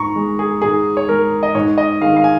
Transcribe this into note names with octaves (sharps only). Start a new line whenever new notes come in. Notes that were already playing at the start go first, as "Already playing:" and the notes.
Already playing: G#2 A#5 C#6
G#3
G#4
G#2 G#4
C#5
G#3 A#4
D#5
G#2 C#5
D#5
D#3 G#3 F5
F5
G#5